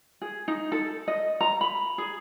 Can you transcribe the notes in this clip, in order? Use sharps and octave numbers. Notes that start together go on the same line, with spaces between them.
G#4
D#4
A4
D#5
A#5
B5
G#4